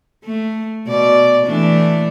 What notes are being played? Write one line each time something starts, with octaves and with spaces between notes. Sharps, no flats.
A3
B2 D5
E3 A3 D4